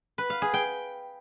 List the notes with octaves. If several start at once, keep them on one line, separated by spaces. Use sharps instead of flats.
B4
F5
G#4
G5